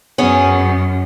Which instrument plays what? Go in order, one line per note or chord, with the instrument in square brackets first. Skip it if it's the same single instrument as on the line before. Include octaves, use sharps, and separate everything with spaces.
[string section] F#2 [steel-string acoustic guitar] B3 C#4 G#4